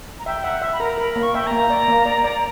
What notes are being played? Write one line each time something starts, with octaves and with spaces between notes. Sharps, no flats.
A#5
E5 G5
E5 F#5
E5
B5
A#4 A#5
A#4 B5
A#3
C#6
E5 G5
A#3 A#5
D5
A#3
D5
D5